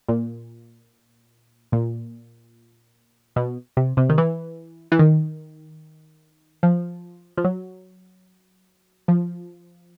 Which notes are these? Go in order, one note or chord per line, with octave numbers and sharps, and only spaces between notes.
A#2
A#2
B2
C3
C3
D#3
E3
E3
D#3
F3
F3
F#3
F3